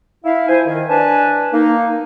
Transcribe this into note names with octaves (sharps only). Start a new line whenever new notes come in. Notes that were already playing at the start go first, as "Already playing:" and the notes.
E4 F5
F3 C5 G#5
D#3
D4 B4 G#5 A5
A#3 D#4